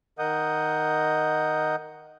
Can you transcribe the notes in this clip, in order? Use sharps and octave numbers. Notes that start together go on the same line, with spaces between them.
D#3 A#4 D#5 F#5 D#6 G6